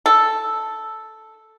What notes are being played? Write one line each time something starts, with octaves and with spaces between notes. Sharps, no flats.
A4